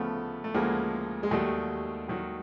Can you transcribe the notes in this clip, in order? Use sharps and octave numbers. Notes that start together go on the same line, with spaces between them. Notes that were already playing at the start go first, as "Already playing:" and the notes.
Already playing: D2 C#3 F3 A3 B3
A3
D2 C#3 F3 G#3 A#3
G#3
D#2 D#3 F#3 G3 A3
D#2 D#3 F#3